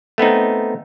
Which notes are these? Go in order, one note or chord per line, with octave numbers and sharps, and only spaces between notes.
A3 B3 C4 D#4